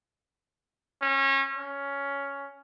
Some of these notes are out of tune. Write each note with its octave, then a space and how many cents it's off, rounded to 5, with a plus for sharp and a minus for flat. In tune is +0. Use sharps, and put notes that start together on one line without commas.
C#4 -30
C#4 +10